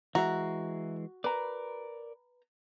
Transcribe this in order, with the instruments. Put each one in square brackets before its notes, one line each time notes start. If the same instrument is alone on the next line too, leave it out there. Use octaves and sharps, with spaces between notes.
[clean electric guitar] E3 G#3 [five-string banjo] F#4 [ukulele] E5 A#5
[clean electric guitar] A#4 D5 [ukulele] B4 A#5